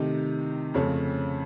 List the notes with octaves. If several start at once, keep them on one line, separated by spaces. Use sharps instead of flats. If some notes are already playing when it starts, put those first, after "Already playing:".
Already playing: C3 D#3 A3 D#4
F2 C#3 A3 C#4